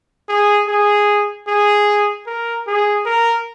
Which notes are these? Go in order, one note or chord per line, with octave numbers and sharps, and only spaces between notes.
G#4
G#4
G#4
A#4
G#4
A#4